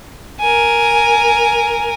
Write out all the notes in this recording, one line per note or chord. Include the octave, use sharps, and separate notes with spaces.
A#4 G#5